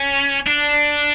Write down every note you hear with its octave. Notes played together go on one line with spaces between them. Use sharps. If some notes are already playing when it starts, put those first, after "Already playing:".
Already playing: C#4
D4